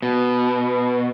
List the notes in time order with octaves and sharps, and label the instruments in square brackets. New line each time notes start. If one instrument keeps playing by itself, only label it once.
[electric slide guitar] B2